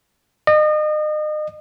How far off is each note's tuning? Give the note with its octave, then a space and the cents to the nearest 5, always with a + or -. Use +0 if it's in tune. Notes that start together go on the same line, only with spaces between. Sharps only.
D#5 -35